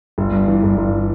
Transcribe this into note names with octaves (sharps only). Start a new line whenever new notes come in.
G1
G2
E3
G1
G1